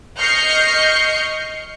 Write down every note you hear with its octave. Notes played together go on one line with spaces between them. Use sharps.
D#5 C#6 F6 G6 C7 C#7